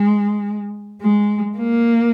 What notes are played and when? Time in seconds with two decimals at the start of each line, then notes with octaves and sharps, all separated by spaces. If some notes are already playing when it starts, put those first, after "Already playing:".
Already playing: G#3
1.02 G#3
1.58 A#3